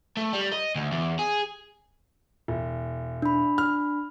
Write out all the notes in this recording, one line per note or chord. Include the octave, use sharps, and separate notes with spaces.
A3
G3
D#5
D2
E2
G#4
E1
D4 B5
F6